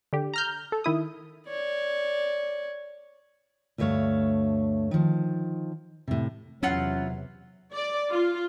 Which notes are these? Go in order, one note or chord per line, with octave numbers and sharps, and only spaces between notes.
D3 G4
A#5 F6 G6
A4
D#3 E4 D#6
C#5 D5
D2 G2 A3 C#5 F5
D#3 F3
A2 C3
E2 C3 F#3 C#4 E4 F4 F#5
D5
F4